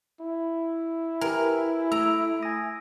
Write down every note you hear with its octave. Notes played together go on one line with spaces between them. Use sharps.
E4
G4 A#4 B4 G#5
A3 A#5 E6 D7
G#5 D#6 A#6